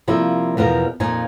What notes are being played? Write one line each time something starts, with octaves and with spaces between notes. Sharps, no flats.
C3 F3 G3 A#3 E4
E2 B2 F3 A#4
F2 A#2 F3 D#4 G#5